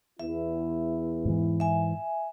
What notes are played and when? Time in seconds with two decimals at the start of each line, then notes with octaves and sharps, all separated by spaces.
0.19 E2 E4 E5
1.25 G#2 E3
1.60 E5 G#5